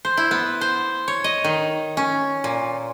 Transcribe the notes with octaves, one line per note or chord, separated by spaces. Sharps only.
C5
E4
B3
C5
C#5
D#5
D#3
C#4
A#2